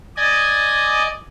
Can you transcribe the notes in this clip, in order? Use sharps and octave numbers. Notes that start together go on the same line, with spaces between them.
D5 D#5 G#5